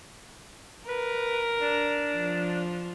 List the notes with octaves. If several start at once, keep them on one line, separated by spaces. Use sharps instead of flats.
A#4 B4
D4
F3